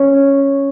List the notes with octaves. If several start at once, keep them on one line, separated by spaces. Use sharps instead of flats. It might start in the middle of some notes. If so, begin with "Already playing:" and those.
Already playing: C#4